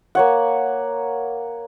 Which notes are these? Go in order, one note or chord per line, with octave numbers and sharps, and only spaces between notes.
A#3 C#5 F#5